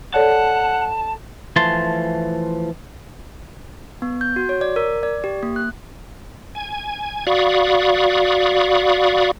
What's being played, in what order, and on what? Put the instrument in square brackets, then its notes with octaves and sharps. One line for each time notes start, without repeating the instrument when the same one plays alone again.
[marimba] A4 C#5 D5 [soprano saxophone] F#5 [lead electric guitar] A5
[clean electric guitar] E3 F3 A3 A5 C6
[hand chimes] B3
G6
F#4
C#5
D5
A#4
D5
G4
A#3
F#6
[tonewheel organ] G#5
F#4 D5 F5 B5 C#6 D#6